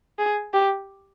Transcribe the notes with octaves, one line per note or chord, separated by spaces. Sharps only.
G#4
G4